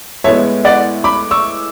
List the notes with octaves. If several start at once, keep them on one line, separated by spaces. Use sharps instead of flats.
A2 G#3 B3 C#5 E5
D5 F#5
B5 D6
C#6 E6